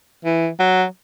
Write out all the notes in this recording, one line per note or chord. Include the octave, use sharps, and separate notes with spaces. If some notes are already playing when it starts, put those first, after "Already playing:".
E3
F#3